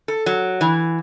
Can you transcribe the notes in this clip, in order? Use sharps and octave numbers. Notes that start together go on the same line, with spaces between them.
A4
F#3
E3